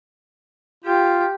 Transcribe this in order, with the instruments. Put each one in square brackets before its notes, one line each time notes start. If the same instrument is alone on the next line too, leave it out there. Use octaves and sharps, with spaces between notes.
[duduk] F4 [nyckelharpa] G4 G5